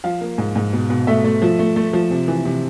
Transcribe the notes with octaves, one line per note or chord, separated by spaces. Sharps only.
F3 F5
A#3
G#2
G#2
B2
B2
A3 E5
A3
F3
A3
A3
F3
C3
E3
C3